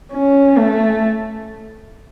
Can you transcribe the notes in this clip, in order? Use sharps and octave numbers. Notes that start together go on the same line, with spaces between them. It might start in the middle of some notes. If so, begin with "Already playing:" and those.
C#4
A3